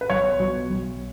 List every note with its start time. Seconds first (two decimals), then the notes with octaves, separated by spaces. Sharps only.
0.01 B4
0.10 B1 C#5
0.39 B2 F#3
0.70 B1